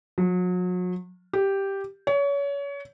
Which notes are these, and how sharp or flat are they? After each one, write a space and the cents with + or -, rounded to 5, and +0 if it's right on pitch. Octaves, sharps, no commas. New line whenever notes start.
F#3 -40
G4 +0
C#5 +30